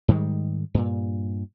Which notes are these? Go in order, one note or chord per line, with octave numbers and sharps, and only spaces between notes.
G#2 D#3 G3 G#3
G2 A#2